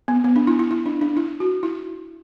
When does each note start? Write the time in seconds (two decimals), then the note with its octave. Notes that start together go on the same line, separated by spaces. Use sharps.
0.08 B3
0.24 B3
0.36 D4
0.47 E4
0.59 E4
0.71 E4
0.86 D4
1.01 D4
1.17 E4
1.40 F#4
1.63 E4